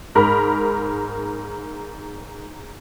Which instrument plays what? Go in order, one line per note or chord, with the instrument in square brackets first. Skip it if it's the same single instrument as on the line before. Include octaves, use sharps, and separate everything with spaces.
[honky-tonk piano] G#2 A#4 B5